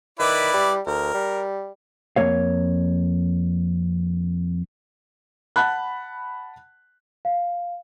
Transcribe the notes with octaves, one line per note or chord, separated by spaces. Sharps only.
D#3 E4 B4 D5
G3
D2 A#4
G3
F2 A#3 C#5 F5
F#5 A5 B5 F#6
F5